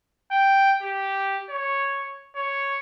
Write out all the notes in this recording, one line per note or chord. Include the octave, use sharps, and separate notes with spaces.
G5
G4
C#5
C#5